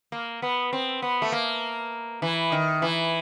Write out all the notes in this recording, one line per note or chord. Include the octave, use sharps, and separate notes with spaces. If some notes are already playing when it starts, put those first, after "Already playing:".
A#3
B3
C4
B3
A3
A#3
E3
D#3
E3